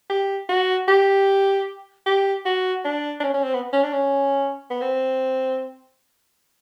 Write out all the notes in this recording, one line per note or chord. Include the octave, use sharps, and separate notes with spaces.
G4
F#4
G4
G4
F#4
D4
D4
C#4
C#4
C4
B3
C#4
D4
C#4
B3
C4